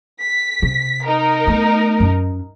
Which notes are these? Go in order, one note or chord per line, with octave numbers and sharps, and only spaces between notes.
B6
C3
D#4 A#4
A3 B3
F#2